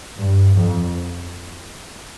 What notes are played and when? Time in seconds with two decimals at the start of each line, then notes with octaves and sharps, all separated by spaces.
0.19 G2
0.56 F2